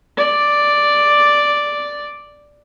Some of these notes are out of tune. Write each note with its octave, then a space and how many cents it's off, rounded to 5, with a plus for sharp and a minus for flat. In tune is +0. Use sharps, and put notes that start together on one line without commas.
D5 +0